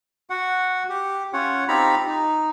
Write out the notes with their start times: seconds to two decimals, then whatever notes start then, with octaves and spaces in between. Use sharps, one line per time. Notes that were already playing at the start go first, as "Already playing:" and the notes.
0.30 F#4 F#5
0.89 G4
1.33 C#4 F4 C#5 F#5
1.68 C4 D#4 F4 G4 A#5 B5
2.07 D#4